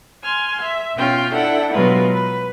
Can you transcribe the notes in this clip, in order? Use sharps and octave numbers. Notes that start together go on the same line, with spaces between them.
G#5 C6 F6
E5
B2 C#4 F4 G5 F6
D4 E4 A4 F#5 G5
B2 F#3 G#3 F4 A#4 B4
B4